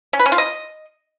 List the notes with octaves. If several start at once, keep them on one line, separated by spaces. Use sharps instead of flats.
C#4
B4
C#4
F4
D#5